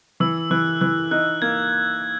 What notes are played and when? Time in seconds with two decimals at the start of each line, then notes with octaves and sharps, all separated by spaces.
0.20 E3 E6
0.51 E3 F#6
0.81 E3 F#6
1.11 D#4 F#6
1.42 A#3 G#6